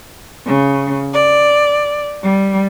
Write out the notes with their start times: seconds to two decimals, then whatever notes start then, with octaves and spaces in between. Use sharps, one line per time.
0.46 C#3
1.14 D5
2.22 G3